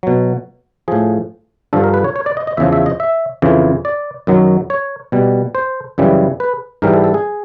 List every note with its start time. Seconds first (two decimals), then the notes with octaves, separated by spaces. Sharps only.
0.03 B2 F#3
0.88 A2 F3 G#4
1.73 G2 D3 F3 A4
1.84 A#4
1.94 B4
2.04 C#5
2.16 C#5
2.26 D5
2.37 D#5
2.47 D#5
2.57 E2 C#3 F3 E5
2.73 E5
2.86 D#5
3.00 E5
3.42 F2 C#3 E3
3.85 D5
4.27 F#2 D#3 F#3
4.70 C#5
5.12 B2 G3
5.55 C5
5.98 F#2 C#3 E3 G3
6.40 B4
6.82 G#2 E3 G3 A#4
6.93 A4
7.04 A4
7.14 G#4